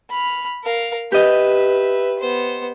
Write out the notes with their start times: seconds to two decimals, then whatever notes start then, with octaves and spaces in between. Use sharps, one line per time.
0.10 B5 F6
0.64 A#4 F5
1.12 G4 B4 D#5 E5
2.19 B3 C5